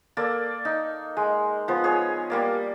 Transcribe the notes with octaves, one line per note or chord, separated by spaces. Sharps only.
A#3 A4 D5
D#4
G#3
F3 B3
G#4 C#5
G3 A#3 D5